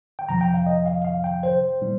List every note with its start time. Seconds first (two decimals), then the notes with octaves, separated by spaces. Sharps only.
0.19 G5
0.29 F2 C3 F3 A#5
0.41 G5
0.54 F5
0.67 D#5
0.86 F5
1.05 F5
1.24 G5
1.43 C5
1.81 A#2 G3 D#4